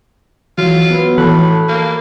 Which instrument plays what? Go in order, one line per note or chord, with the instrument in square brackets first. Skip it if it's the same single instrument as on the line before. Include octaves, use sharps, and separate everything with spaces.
[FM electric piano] E3 [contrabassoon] F#3 [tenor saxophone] F4
[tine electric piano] B3 B4
[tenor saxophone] A2 [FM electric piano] E3 A5 [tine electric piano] A4 B5 F#6
[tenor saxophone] A#3